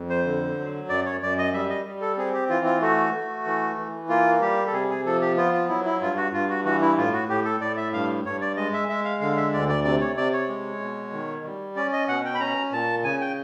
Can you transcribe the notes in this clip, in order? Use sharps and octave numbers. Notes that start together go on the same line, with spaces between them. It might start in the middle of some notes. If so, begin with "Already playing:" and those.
Already playing: F2
C5
D3
F#3
F#2 D5
C#5
F#2 D5
D#5
G3 E5
D#5
G3
A4
C4 G#4
G4
E3 F4
F4
A3 F#4
A3
E3
E3
A#3 F4
G3 G4
A4
C3 G#4
G#4
F3 A4
G4
B3 F4
F4
F#3 E4
E4
G2 F4
F#4
G2 F4
F#4
E3 F#4
E4
A2 F4
F#4
A2 G4
A4
A2 D5
E5
G2 F5
G2 C#5
D5
G#3 D#5
E5
G#3 E5
F5
D3 F5
E5
D2 D5
D5
C3 D5
C#5
C3 D5
C#5
G#3
B2
D#3
G3
C#4 D5
D#5
B2 F#5
G5
B5
C#4 A#5
A#2 A5
C#3 G#5
G5